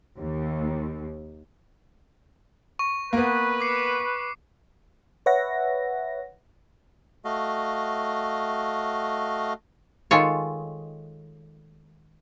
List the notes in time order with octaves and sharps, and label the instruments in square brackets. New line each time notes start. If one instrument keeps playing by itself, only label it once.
[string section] D#2
[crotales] C#6
[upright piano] A#3 B3 [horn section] B4
[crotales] D6 C7 C#7
[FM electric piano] B4 C#5 E5 F#5 A#6
[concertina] A3 F#4 D#5 F5
[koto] D#3 G#3 F4 A4 C#5